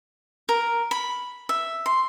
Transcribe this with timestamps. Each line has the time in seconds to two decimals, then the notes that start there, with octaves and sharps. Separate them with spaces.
0.49 A#4
0.91 B5
1.49 E5
1.86 C6